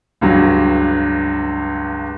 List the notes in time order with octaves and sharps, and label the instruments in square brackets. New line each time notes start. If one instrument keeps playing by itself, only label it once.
[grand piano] C#2 G2 F#3